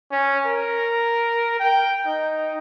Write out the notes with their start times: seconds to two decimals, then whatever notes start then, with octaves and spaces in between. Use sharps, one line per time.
0.11 C#4
0.46 A#4
1.60 G5
2.06 D#4